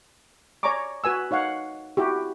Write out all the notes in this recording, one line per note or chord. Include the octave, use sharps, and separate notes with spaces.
C#5 D5 G#5 A#5 C#6 D6
F#4 B4 G#5 E6
D#4 C#5 F5 F#5
E4 F#4 G4